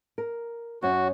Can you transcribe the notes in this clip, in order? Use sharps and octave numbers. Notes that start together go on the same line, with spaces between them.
A#4
F#2 F#3 C#4 F#4